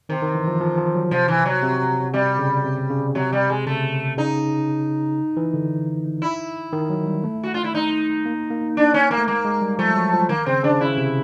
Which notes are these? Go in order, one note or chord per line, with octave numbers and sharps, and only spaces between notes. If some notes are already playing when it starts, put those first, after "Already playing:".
C3 D#3
D#3
E3
F3
F3
F3
F#3
C3 F3
E3
F#3
C3
C3 G3
C#3
C3
C#3
C3 F#3
G3
G#3
C#3 A3
C#3 D#4
E3
D3
E4
D#3
F#3
G3
A3
F#4
F4
E4
D#4
A#3
A#3
D4
C#4
A#3
A3
G#3 A#3
G#3
G3
F3 A3
F#3
F3
D#3 A#3
C#3 C4
C#3 D4
C#3 E4
C3